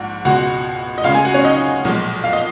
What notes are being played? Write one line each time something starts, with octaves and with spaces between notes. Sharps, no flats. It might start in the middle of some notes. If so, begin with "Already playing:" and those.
Already playing: A#1 G#2 F#5
C#2 B2 G#3 F#4 F#5
D#5
C#2 C#3 G#3 F4 F5
G#4 G#5
F#4 F#5
C#4 C#5
D#4 D#5
B1 A#2 F3 G#3
F5
D#5